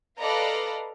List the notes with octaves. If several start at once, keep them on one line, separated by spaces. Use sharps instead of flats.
A4 B4 D5 D#5 F5 A#5